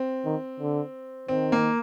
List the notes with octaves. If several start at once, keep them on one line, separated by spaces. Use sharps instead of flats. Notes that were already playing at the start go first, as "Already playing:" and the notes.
Already playing: C4
D#3
D3
D#3 C4
A#3